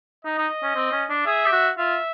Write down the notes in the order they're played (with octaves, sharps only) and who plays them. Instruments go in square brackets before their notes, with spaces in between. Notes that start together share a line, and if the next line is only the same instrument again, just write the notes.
[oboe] D#4 [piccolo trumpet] D#5
[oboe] D#4
C#4
C4
C#4
D4
[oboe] G#4 [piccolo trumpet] E5
[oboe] G4
F#4
[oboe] F4 [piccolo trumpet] E5